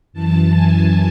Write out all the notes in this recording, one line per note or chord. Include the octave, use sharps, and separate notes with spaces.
F#2 E3 A5
G#5